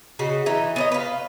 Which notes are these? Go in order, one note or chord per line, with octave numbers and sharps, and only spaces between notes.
C#3 F#4 D#5
E3 D#4
B3 C#5 D#5
B4 F5